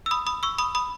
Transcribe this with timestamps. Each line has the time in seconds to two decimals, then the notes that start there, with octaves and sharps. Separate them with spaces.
0.06 E6
0.11 B5 D#6
0.27 B5 D#6
0.43 C#6 E6
0.58 B5 D#6
0.75 B5 D#6